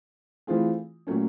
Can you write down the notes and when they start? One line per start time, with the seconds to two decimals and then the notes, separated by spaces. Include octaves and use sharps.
0.47 E3 A3 C4 F4 G#4
1.07 A#2 F#3 A3 C#4